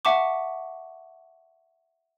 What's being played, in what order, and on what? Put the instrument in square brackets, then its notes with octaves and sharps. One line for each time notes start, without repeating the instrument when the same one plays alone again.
[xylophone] E5 F#5 A5 C#6 D6